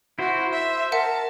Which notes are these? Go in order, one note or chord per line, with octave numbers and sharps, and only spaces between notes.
E4 F#4 C5
C5 E5
A#4 E5 F#5 A5 C#7